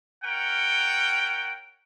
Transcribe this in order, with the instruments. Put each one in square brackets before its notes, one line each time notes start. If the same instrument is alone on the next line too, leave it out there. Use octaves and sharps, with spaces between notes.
[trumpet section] C#4 A#4 F#5 G5